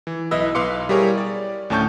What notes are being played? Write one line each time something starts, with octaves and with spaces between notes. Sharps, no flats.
E3
B1 E4 B4 D#5 E6
B1 B4 F5 C6 D6 C#7
G3 E4 G4 G#4 A#4 C#5
D5
D2 A2 C#4 A5 C#6 G6